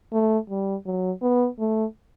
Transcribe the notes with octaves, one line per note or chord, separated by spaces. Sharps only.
A3
G3
F#3
B3
A3